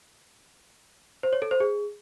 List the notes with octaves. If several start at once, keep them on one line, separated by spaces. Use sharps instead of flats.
C5
C#5
A4
C5
G#4